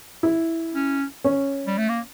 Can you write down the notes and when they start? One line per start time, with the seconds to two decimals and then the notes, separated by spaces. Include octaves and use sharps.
0.23 E4
0.74 C#4
1.24 C#4
1.67 G3
1.78 A3
1.89 A#3